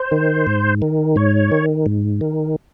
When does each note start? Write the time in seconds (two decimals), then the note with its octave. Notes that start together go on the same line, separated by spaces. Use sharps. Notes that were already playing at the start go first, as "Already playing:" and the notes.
Already playing: C5
0.12 D#3
0.47 G#2
0.82 D#3
1.16 G#2 C#5
1.52 D#3
1.86 G#2
2.21 D#3